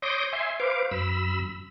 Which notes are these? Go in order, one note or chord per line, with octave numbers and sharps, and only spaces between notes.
C#5 C6 D6 D#6 G6 A#6
E5 G#5 C6
B4 C5 F5 D6
F#2 B5 E6